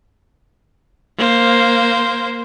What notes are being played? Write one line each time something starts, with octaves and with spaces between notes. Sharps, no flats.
A#3 C5